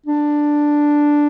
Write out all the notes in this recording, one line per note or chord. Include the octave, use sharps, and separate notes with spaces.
D4